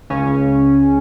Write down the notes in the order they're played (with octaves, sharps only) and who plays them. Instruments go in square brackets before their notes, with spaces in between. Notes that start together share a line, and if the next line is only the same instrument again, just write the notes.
[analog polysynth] C#2 C#3 C#4